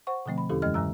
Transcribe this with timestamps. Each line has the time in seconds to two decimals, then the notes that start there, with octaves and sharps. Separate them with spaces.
0.07 C5 F#5 C#6
0.26 B2 D3 F3 A3 C4
0.38 B5
0.50 E2 D3 C#4 E4 G4 A4
0.62 F#2 E3 G#3 C#4 D#5 F6
0.74 G2 C#3 F#3 A#5 E6